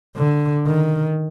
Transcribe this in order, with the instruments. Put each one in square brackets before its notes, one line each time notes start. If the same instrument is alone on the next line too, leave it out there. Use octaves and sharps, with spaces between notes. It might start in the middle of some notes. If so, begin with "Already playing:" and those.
[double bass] D3
D#3